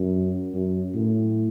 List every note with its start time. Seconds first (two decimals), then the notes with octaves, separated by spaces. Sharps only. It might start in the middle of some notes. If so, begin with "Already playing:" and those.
Already playing: F#2
0.54 F#2
0.94 A2